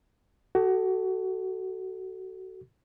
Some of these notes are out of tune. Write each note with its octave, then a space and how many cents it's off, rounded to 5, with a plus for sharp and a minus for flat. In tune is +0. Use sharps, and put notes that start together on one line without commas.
F#4 +25 A4 +0